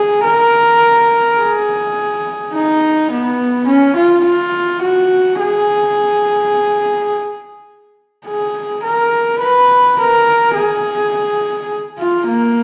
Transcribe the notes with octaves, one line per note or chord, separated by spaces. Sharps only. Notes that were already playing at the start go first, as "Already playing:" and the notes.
Already playing: G#4
A#4
G#4
D#4
B3
C#4
F4
F4
F#4
G#4
G#4
A#4
B4
A#4
G#4
F4
A#3